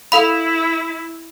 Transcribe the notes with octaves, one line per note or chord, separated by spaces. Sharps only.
E4 A4 F5 B5